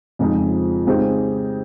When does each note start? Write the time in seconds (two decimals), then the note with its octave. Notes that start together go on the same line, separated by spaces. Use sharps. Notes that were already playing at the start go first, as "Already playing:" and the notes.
0.19 F2 C#3 F3 G#3 D#4
0.87 C#3 G#3 C4 D#4 G4